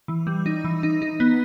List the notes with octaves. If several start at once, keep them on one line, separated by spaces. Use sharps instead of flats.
E3
G3
D#4
E3
D#4
D#4
B3